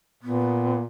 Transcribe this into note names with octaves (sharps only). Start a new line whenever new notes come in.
A#2 B3